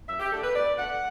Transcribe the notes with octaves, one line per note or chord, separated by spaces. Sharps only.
F#2 E5
G4
D3 A3 D4 A4
B4
B2 D5
A3 D4 F#5